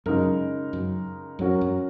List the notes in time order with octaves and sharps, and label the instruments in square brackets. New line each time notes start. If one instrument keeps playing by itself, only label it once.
[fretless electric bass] F#2 [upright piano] C#3 G#3 D#4 A#4
[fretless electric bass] F#2
[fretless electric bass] F#2 [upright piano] F#3 C#4 F#4 A#4
[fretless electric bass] F#2